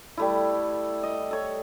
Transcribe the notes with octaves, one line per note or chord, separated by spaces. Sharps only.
G3 A3 E4
D#5
A4 C#5